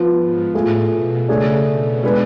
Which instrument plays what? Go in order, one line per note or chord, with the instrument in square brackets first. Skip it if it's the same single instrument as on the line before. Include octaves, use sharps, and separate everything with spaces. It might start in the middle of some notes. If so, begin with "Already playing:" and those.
Already playing: [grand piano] F3 B3 F4 B4
[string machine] G#2
[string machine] A2 [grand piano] A3 F4 G#4
[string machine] B2
[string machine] C#3 [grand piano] A3 D4 G#4 C#5
[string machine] B2
[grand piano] G#3 D4 G#4 B4